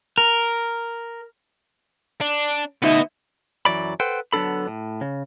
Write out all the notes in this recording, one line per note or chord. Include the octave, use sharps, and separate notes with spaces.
A#4
D4
D2 B3 D#4 D#5 E5
F#2 E3 F#3 D5 B5
A4 B4 C5 F#5 G5
D3 F#3 B3 D4 A4 B5
A2
C#3